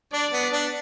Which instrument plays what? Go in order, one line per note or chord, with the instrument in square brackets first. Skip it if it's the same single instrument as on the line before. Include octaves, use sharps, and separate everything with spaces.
[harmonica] D4 [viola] D5
[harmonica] B3
D4